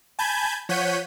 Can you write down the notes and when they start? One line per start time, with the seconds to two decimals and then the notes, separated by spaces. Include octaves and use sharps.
0.19 G#5 A5 B5 G6 G#6
0.69 F3 C#5 F#5 G6 B6 D#7